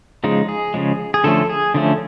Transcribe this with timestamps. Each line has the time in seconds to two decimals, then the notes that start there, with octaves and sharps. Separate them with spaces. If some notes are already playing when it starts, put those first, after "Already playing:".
0.24 C#3 F3 G#3 D#4
0.49 G#4
0.74 C#3 F3 G#3
1.14 G#4
1.24 D3 F3 A3 C#4 A4
1.49 G#4
1.74 D3 F3 A3 C#4